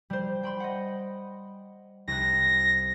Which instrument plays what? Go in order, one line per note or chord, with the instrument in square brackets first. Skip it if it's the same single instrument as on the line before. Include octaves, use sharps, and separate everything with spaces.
[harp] G3 C5
G5 B5 C6
D#5 F#5
[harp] C2 F#6 [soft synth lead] A#6